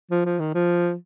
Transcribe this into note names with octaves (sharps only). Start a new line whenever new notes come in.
F3
F3
D#3
F3